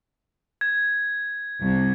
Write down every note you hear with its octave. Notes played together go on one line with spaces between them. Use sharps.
G#6
C2